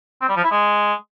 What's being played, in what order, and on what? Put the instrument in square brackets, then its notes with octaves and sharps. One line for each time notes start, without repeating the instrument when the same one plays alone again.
[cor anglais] C4
G3
F3
E4
G#3